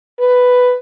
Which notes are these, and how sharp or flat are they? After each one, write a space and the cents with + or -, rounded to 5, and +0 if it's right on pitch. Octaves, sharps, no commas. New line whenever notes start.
B4 +5